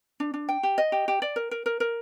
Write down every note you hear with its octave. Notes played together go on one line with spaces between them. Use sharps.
D4
D4
G5
G4
D#5
G4
G4
D5
A#4
A#4
A#4
A#4